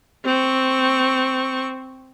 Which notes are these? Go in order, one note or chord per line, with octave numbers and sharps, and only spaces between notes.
C4 C#6